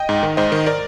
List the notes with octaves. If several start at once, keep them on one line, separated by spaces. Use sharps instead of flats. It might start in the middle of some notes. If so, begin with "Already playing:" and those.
Already playing: D#5 G5
G#2
D#3
G#2 C5 D#5
D#3
A#4 D5